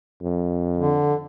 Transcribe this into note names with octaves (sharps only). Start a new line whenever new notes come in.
F2
D3